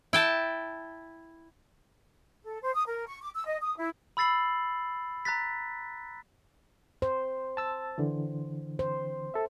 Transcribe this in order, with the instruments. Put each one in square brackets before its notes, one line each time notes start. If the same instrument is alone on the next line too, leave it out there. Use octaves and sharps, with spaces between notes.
[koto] E4 G5 A5
[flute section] A4
C5
D#6
A#4
C#6
D6
E6
D#5
D#6
E4
[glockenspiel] B5 E6 A6 C7 F#7
A#5 F#6 A6 B6
[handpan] C5
[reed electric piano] A5 E6 A6
D3 E3
[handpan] C5
[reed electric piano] A4 E5